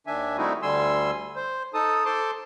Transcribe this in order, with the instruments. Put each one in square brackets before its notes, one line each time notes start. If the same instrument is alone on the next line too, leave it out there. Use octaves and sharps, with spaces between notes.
[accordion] D#2 D#3 D4 E5 G#5
G3 A3 C4 D#4 E4 F#4
D2 D3 G3 G#5 C6 E6
C5
D#4 A4 A5 D#6
A4 C5 A5 C6 D6